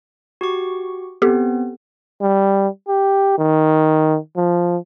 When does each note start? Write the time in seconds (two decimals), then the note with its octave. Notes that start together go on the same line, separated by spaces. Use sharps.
0.41 F#4 G4 C#6
1.22 B3 C4 G4 A4
2.22 G3
2.88 G4
3.38 D#3
4.37 F3